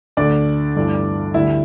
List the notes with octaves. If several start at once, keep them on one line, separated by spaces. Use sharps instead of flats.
D2 D3 A3 D4 D5
G1 G2 E3 A3
D2 D3 G3 E4 E5